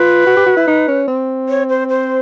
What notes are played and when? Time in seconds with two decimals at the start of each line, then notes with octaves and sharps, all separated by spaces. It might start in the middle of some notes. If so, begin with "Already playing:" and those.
Already playing: F4 B4
0.26 F#4
0.36 G4
0.46 F#4
0.56 E4
0.67 D#4
0.88 C#4
1.07 C4
1.49 C#5
1.70 C5
1.90 C5